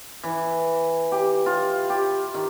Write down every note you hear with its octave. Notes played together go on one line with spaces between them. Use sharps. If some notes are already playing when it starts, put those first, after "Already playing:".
E3
G4
F4
G4
D#3